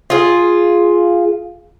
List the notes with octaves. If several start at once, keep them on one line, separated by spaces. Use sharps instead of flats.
F4 G#4